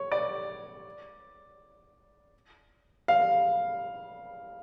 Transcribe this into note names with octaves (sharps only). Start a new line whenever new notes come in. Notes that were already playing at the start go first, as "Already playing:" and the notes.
Already playing: C#5
D5
F5